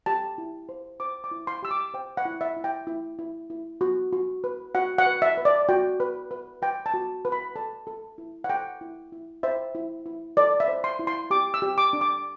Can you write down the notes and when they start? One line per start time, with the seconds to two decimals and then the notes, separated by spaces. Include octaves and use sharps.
0.06 G4 A5
0.38 E4
0.69 C5
1.00 C5 D6
1.24 D6
1.31 E4
1.47 C6
1.63 G4 E6
1.71 D6
1.94 C5 G5
2.17 F#5
2.25 E4
2.41 E5
2.57 E4
2.64 G5
2.87 E4
3.19 E4
3.50 E4
3.81 F#4
4.13 F#4
4.44 B4
4.75 F#4 F#5
4.98 F#5
5.06 B4
5.22 E5
5.37 B4
5.45 D5
5.69 F#4 G5
6.00 B4
6.31 B4
6.62 B4 G5
6.86 A5
6.94 F#4
7.25 B4
7.32 B5
7.56 A4 A5
7.87 A4
8.18 E4
8.44 F#5
8.50 A4 G5
8.81 E4
9.12 E4
9.43 C5 E5
9.75 E4
10.06 E4
10.37 A4 D5
10.60 E5
10.68 C5
10.84 C6
10.99 E4
11.07 C6
11.31 G4 D6
11.54 E6
11.62 G4
11.78 D6
11.93 D4
12.01 D6